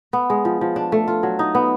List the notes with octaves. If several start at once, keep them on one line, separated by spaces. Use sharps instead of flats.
B3
G#3
F3
F3
D4
A3
F4
F#3
D#4
B3